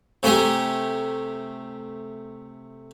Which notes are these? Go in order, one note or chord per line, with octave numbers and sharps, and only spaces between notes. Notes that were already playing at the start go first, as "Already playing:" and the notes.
C3 A3 G4 G#5 A#5